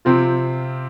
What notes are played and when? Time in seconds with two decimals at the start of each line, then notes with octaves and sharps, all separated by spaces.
0.05 C3 F3 C4 F4